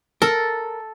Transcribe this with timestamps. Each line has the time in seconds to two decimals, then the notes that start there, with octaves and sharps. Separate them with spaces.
0.22 A4 A#4